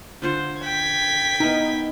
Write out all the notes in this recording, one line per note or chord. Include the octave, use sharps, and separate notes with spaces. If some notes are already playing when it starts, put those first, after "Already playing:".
D3 F4 C5 F#5
G5 G#6 B6
B3 D#4 E4 A#4